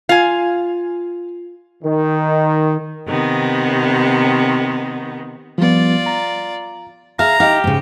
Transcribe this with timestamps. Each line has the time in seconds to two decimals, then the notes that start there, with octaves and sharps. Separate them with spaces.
0.09 F4 F5 G#5
1.83 D#3
3.07 C3 D#3 B3
5.58 F3 G3 B3 F4 D5
6.06 A#5
7.19 G#4 E5 F5 A#5
7.40 D#4 G4 F5
7.64 G#2 C#3